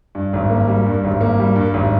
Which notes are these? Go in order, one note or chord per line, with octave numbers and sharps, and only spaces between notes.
G2
G#1
A#3
G3
G2
G#1
A#3
G3
G2
G#1